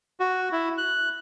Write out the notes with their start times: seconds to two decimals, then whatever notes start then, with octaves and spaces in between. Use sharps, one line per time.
0.20 F#4
0.52 E4
0.78 F#6